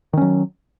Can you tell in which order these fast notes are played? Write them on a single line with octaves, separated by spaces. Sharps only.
D#3 C#4 F#3